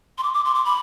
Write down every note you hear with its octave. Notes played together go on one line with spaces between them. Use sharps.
C6
D6
D6
C6
D6
B5